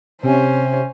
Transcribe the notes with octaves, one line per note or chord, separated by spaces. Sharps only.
C3 C#4 C5